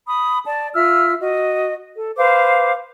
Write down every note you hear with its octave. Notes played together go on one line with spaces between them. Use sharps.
B5 D#6
D5 A5
F4 E5 E6 F6
F#4 D#5
A4
B4 C5 F5 D6